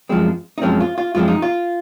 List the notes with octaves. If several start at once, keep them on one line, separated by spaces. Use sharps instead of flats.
F#2 F3 G#3 C4
D#4
F#2 F3 G#3 C4 C#4
F4
F4
F#2 F3 G#3 C4 F4
D#4
F4